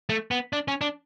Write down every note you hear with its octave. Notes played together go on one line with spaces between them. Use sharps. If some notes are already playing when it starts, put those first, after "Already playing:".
A3
B3
D4
C#4
D4